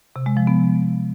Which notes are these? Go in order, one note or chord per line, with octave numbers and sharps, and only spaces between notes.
C3
G#3
F3
B3